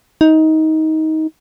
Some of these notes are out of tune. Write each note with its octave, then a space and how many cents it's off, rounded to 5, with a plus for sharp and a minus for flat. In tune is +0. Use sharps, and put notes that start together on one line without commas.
D#4 +20